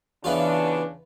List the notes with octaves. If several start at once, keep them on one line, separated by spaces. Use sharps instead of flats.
C#3 E3 B3 D4 F4